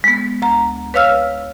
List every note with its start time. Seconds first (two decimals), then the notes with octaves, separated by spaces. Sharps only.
0.04 G#3 B3
0.42 D2 A#5
0.94 B4 C#5 F5 E6 F6